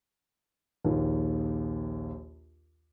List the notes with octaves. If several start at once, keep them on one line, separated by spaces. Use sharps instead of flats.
A#1 D#2 D#3